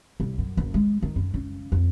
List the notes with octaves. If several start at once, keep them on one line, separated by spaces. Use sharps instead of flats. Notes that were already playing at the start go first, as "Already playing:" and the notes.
C2
F#2
F#1
G#3
D#3
F#2
C#3
F2